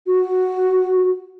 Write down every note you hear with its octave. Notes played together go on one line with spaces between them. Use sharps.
F#4